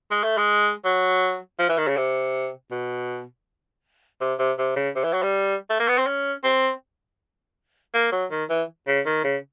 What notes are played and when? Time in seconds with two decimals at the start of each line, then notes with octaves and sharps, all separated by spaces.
0.11 G#3
0.23 A3
0.37 G#3
0.85 F#3
1.59 F3
1.69 E3
1.78 D#3
1.87 C#3
1.97 C3
2.71 B2
4.21 C3
4.39 C3
4.58 C3
4.76 C#3
4.95 C3
5.04 E3
5.13 F#3
5.23 G3
5.69 A3
5.79 A#3
5.88 B3
5.98 C4
6.07 C#4
6.44 C4
7.94 A#3
8.12 F#3
8.31 D#3
8.49 E3
8.87 C#3
9.06 D#3
9.24 C#3